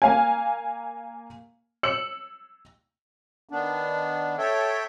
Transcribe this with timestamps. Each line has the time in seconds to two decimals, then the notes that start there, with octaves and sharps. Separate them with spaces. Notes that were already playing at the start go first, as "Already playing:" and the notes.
0.02 A#3 F5 G#5
1.83 E6 C#7 F#7
3.49 D#3 B3 D4
4.38 A4 C#5 E5 G5